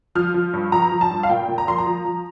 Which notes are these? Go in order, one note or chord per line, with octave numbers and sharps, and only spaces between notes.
F3 F6
F3
G2
F3 A#5
F3
A5
G2
F5
A#2 G5
A#2
A#5
F3 C6
A#5
F3
F3